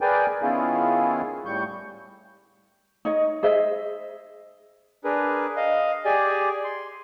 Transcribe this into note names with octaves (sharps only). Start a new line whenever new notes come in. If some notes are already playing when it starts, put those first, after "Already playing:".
G#4 A#4 B4 D5 G5 G#5
D#3 B3 C#4 E4 F4 G#4
A2 G3 C#6 G6
D#4 C#5 D#5
G#4 C5 D#5 E5
D4 G#4 A#4 B4
D#5 F5
G4 G#4 D5 G#5
C6